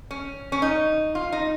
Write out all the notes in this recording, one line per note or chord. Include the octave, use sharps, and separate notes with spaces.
C#4
C#4
D#4
F4
D#4